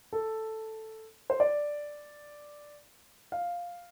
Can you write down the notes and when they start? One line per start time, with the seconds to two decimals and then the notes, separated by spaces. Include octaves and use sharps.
0.13 A4
1.30 C5
1.40 D5
3.32 F5